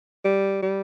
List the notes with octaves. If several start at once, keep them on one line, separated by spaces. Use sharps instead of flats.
G3
G3